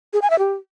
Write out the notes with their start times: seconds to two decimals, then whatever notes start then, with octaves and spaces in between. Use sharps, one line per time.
0.13 G#4
0.22 G#5
0.30 E5
0.39 G4